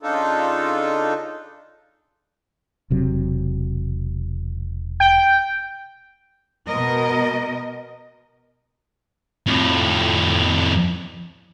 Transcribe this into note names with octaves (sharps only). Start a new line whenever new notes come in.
C#3 D4 D#4 F4 A4
E1 C3 F#3
G5
B2 A#4 D#5
F2 A2